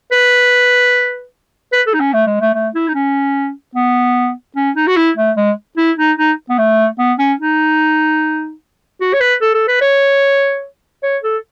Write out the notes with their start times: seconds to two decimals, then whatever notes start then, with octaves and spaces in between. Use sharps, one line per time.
0.12 B4
1.72 B4
1.87 A4
1.94 D#4
2.00 C#4
2.13 A3
2.27 G#3
2.41 A3
2.54 A3
2.75 E4
2.88 D#4
2.94 C#4
3.75 B3
4.56 C#4
4.76 D#4
4.87 F#4
4.97 E4
5.17 A3
5.37 G#3
5.77 E4
5.98 D#4
6.18 D#4
6.49 B3
6.58 A3
6.99 B3
7.19 C#4
7.40 D#4
9.01 F#4
9.13 C#5
9.21 B4
9.41 A4
9.54 A4
9.68 B4
9.81 C#5
11.03 C#5
11.23 A4